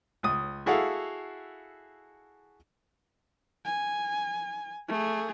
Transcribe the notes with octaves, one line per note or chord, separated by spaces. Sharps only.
C#2 D#6
E4 F#4 G#4 A4 F5 F#5
G#5
A3 G#4